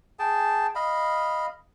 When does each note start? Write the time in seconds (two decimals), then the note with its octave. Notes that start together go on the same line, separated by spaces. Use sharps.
0.19 G#4 G5 A5
0.75 D#5 F5 B5